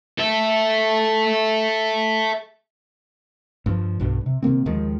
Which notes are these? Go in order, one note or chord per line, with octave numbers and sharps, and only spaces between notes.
A4 E5
G2 F3
B1 G2
C3
C3 D#3 A#3 C4
D#2 D#3 F3 G#3